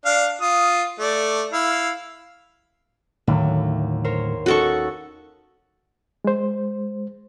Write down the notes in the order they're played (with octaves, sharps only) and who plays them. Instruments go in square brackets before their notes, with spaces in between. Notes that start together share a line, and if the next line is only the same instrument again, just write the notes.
[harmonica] D4 F5
F4 D#6
A3 D5
E4 F5
[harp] D#2 [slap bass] A2 D3 F#3
[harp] A#4 C5 C#5
[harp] C#4 D#4 [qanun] F#4 A4 C#6
[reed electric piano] G#3 C5